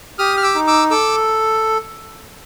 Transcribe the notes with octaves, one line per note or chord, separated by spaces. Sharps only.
G4 D#6 F6
F6
D6 E6
D#4
D6 E6
A4 D6 E6